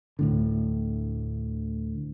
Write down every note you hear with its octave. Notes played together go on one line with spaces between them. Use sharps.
D2 A2 D3